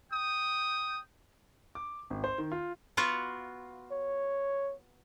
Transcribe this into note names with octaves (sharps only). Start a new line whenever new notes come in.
G5 D#6
D6
G#1
C5
D#3
F4
B3 F4 F#4
C#5